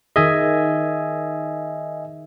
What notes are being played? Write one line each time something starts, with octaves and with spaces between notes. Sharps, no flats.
D#3 D#4 G#4 D#5 E5 G#5